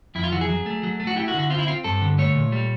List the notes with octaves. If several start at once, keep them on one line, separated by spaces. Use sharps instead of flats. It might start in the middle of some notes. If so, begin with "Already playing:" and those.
F2 E4
F4
E3 F#4
G#4
F#3
A3
F#3
A3
F#4
E4 G4
F#4
D3
F#4
C4 F4
E4
C4 F4
G2 A4
D3
A3 C#5
A#2
G3